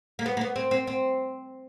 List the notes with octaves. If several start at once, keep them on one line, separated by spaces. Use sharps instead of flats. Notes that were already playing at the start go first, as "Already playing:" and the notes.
A#3
B3
A#3
B3
C4
C4
C4